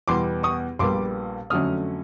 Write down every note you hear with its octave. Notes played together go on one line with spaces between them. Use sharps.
E2 B2 G3 B3 C6 D6
C#6 D#6
A#1 A#2 G3 B3 C6 D6
F2 D3 F#3 A3 C#4 D#6 F6